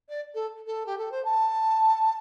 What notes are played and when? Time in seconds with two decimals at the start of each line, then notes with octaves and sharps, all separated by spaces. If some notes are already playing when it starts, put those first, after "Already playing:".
0.09 D5
0.34 A4
0.66 A4
0.86 G4
0.98 A4
1.11 C5
1.25 A5